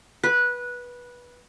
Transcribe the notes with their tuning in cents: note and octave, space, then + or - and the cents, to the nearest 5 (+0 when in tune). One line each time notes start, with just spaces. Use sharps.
B4 -15